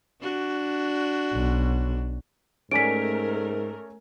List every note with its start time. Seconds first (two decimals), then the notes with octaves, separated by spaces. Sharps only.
0.21 D4 F#4
1.33 B1
2.71 G#2 A3 C#4 A#4 D5 G#5 B6 D7